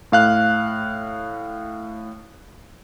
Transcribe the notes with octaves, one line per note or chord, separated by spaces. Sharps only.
A2 F5 F#6